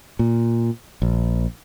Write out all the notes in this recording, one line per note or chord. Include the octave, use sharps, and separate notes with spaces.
A#2
A#1